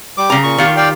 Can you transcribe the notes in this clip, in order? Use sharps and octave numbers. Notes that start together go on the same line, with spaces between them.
G3 D6
C#3 A#5
A#2 C#6
D#3 F4 G4
D5 F5 G5